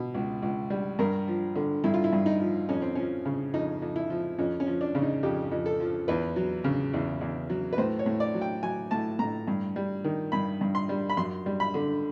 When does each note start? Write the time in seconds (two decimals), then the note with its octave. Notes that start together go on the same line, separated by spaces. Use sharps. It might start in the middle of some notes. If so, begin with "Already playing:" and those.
Already playing: B2
0.14 C#2
0.42 C#2
0.70 G3
0.99 G2 A#4
1.27 F3
1.56 D3
1.84 G2 E4
1.94 F4
2.04 E4
2.13 G2
2.26 D#4
2.40 F3
2.69 F2 C#4
2.82 C4
2.95 F3 C#4
3.25 C#3
3.53 F2 D#4
3.82 F2
3.96 E4
4.10 F3
4.39 F2 C#4
4.60 C#4
4.67 F3
4.81 D4
4.95 C#3
5.02 D#4
5.23 F2 G4
5.51 F2
5.66 A4
5.80 F3
6.08 E2 B4
6.36 F#3
6.64 C#3
6.94 E2
7.21 E2
7.50 F#3
7.73 B4
7.78 A2 C5
7.99 C#5
8.06 A2
8.20 D5
8.34 F#3
8.41 G5
8.63 F#3 G#5
8.91 A2 A5
9.19 A2 A#5
9.47 G2
9.76 G3
10.04 D#3
10.32 G2 B5
10.61 G2
10.75 C6
10.89 G3
11.09 B5
11.17 F#2 C6
11.46 G3
11.60 B5
11.74 D3